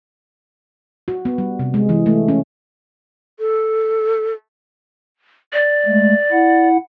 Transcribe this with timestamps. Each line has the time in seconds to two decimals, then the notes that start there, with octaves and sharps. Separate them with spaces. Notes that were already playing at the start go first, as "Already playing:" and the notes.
1.08 F#4
1.25 B3
1.38 G3
1.59 C3
1.74 G#3
1.89 E3
2.06 A3
2.28 C#4
3.38 A4
5.53 D5
5.86 G#3 A3
6.32 E4 F#5